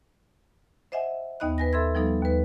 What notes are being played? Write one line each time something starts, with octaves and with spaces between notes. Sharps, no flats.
C5 D#5 E5 F#5 G#5
D#2 B3 D#4 D#5 B5 F#6
B4 G#5 A#6
A4 E5 B5 C6 E6 G#6
F3 G3 B3 D#4 A4
D#2 B4